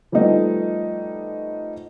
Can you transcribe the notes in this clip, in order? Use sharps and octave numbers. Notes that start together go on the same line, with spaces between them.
F3 G3 A3 B3 D#4